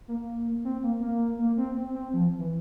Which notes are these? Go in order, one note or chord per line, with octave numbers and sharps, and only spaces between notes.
A#3
C4
A#3
A#3
A#3
C4
C4
C4
F3
E3